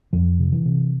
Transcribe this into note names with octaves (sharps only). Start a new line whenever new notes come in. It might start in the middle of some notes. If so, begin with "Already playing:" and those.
F2 F3
C3
E3
C3